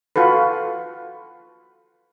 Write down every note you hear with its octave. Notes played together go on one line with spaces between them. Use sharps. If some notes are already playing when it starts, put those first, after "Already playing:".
F4 F#4 A4 B4